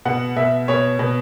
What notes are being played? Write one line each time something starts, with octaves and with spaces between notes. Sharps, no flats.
B2 F#5
B2 E5
B2 C#5
B2